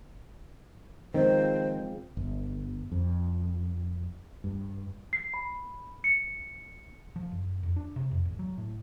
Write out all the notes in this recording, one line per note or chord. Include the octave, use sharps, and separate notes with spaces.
D#3 F3 G#3 C4 C5
G1
F2
G2
C7
B5
C#7
F3
F#1
F2
D4
C3
F2
G#1
F#3
A2